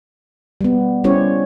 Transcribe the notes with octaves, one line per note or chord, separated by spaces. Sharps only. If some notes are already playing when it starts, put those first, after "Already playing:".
G3 B3
G3 C#4 E4 G4 C5 C#5